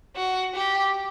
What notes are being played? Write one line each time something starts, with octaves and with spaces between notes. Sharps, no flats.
F#4
G4